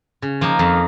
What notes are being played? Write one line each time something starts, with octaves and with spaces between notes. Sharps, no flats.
C#3
F3 A#3 D#4
F2